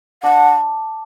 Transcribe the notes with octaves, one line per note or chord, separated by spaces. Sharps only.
D4 F#5